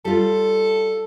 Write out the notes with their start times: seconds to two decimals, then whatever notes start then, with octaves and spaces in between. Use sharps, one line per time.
0.05 G3 F4 A4